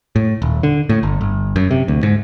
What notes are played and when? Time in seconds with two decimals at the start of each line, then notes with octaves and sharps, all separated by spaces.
0.16 A2
0.42 D#1
0.63 D3
0.89 A2
1.03 G1
1.21 G1
1.56 F#2
1.71 C3
1.88 D2
2.03 G#2